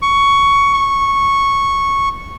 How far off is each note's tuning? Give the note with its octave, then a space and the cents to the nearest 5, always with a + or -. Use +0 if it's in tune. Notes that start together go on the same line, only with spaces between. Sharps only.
C#6 +10
C#6 -10